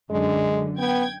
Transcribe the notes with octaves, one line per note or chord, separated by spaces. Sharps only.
F#2 D3 G#3
B3 G5 G#6